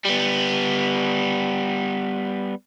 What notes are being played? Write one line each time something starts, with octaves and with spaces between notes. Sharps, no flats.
G3 B3